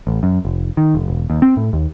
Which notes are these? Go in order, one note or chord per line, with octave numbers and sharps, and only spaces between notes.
A1
F#2
F1
D#3
F1
E1
D#2
C4
A2
D#2